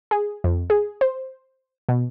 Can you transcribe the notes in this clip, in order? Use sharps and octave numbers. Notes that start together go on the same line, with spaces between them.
G#4
F2
G#4
C5
B2